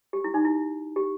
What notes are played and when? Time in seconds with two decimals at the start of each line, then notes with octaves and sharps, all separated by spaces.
0.13 G4
0.24 E4
0.34 D#4
0.45 E4
0.96 G4